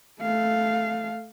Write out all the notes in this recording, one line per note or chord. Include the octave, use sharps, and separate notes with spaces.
A3 F5